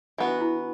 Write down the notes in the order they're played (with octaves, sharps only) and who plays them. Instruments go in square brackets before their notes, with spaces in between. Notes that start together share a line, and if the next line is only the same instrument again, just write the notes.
[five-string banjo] E3 B3 F#4 [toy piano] D4
[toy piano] E4